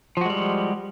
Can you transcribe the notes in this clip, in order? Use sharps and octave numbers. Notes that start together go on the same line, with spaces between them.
F3 G3 G#3 F#4